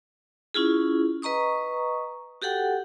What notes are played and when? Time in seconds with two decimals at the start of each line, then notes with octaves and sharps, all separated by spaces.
0.54 C#4 E4 F4 G#4
1.22 B4 D#5 A#5 C#6 D#6
2.42 F#4 G4 A4 F#5 G5